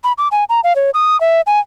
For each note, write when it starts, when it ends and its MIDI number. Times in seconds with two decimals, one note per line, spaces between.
0.04 0.13 83
0.18 0.28 86
0.32 0.44 80
0.49 0.60 82
0.64 0.75 77
0.76 0.90 73
0.94 1.19 87
1.21 1.41 76
1.47 1.60 80